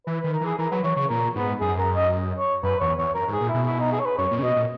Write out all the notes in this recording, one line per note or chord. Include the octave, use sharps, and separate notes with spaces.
E3 B4
B4
D#3
A#4
E3 G#4
E3 A#4
F#3 B4
E3 C#5
C#3 C#5
A#2 A#4
G#2 B3
F#2 G#4
A#4
D#5
C#5
F#2 B4
E2 C#5
E2 C#5
F#2 A#4
G#2
G#4
A#2
E4
B2
E4
D#4
G#4
C#5
B4
F#2 C#5
A#2
C#3
B2 D#5
A#2